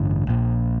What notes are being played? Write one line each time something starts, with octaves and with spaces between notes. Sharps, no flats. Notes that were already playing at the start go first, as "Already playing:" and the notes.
Already playing: A1 G2 D3
A#1 A#2